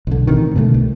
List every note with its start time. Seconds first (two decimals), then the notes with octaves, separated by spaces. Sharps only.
0.07 B1 D3
0.27 A1 C3 D#3
0.55 B2 D3 G3 A3
0.74 C2